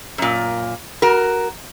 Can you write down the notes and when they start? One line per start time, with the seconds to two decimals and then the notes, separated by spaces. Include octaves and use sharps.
0.18 F#2 A#2
1.02 F#4 A#4